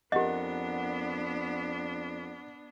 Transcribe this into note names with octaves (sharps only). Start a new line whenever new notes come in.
F2 B3 D4 G4 A#4 D#5 F#5